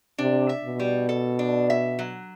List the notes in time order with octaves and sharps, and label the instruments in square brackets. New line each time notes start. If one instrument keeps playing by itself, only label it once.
[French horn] C3 [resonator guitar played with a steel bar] D4
[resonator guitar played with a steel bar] E5
[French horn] B2
[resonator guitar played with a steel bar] G3
A4
D4
E5
F#3